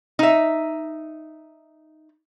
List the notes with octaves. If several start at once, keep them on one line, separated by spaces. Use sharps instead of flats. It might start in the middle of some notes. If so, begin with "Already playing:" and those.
D#4 E5